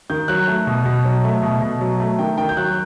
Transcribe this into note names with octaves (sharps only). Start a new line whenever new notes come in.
D#3 G6
F#3 F#6
A3
B2
B2
F#3
A3
B2
B2
F#3
A3
D#3 G5
D#3 G5
G6
F#3 F#6